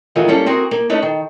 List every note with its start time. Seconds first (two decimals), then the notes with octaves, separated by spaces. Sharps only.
0.16 D#3 E3 F#3 A3 F4 G#4
0.28 G3 A#3 C#4 A4
0.46 C4 F#4 G#4 A#4
0.71 A#3
0.89 A3 C#4 D#4 A4 B4 D5
1.02 D#3